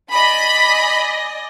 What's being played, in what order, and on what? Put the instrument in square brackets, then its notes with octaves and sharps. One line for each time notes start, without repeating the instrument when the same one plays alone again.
[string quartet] D5 D#5 G#5 [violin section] B5